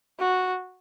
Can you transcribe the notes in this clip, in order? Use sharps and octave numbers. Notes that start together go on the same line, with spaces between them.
F#4